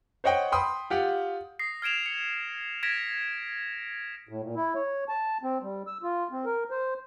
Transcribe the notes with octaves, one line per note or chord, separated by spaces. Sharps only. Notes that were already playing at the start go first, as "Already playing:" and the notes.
C5 C#5 D#5 F#5 G5
G5 B5 C6 D#6
F4 G4 F#5
D#6 A#6 C7
F6 G#6 D7 E7 F7
C#7
G#6 A#6 B6 D7 E7 F7
A2
A#2
E4
C#5
A5
C4
G3
E6
F4
C4
A#4
C5